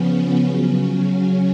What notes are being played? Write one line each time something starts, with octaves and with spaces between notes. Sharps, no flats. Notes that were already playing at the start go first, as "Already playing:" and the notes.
Already playing: C#3 F3 B3 C#4
B3
C#3 F#3 C#4